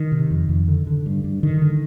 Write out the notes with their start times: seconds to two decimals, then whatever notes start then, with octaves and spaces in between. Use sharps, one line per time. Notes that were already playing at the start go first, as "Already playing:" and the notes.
Already playing: D#3
0.12 C3
0.31 F2
0.49 F2
0.68 D3
0.87 D3
1.06 G2
1.24 G2
1.43 D3 D#3
1.62 D3